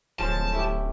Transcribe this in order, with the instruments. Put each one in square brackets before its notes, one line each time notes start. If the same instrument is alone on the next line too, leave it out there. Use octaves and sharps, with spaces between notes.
[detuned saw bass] D1 [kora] F3 G#3 C#4 [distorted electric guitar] A5
[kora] A3 E4 G4